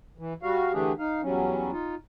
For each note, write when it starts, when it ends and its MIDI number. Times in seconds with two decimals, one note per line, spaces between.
0.18 0.33 52
0.43 0.72 55
0.43 0.72 66
0.43 0.72 77
0.73 0.92 50
0.73 0.92 52
0.73 0.92 57
0.73 0.92 62
0.73 0.92 67
0.73 0.92 68
0.99 1.21 63
0.99 1.21 77
1.23 1.71 40
1.23 1.71 54
1.23 1.71 55
1.23 1.71 61
1.72 1.95 63
1.72 1.95 65